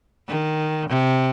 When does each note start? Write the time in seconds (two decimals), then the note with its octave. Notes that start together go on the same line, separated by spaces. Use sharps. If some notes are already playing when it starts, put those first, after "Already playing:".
0.29 D#3
0.90 C3